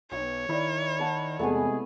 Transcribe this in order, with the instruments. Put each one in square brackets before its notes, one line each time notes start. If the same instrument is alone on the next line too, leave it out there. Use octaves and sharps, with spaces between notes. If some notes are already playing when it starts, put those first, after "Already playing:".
[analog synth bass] B1 [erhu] C#5
[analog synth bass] D#3 [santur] E4 D5
[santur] F#5 A5 B5
[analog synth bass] E2 [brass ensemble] C3 G#3 G#4 [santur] A3 B3 G#5